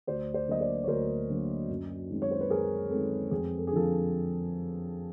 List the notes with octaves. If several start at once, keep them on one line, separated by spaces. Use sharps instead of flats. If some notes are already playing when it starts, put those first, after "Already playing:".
D2 C5 D5
C5 D5
D3 F#3 A#3 D#5
C5 D5
C#5
D2 A#4 C5
D3 F#3 A#3
F#2
D#3 G#3 C4
C#5
C5
B4
F#2 G#4 A#4
D#3 G#3 C4 A4
F2 G#4
A4
G#4
D3 F3 A4